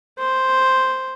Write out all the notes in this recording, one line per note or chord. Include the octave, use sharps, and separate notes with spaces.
C5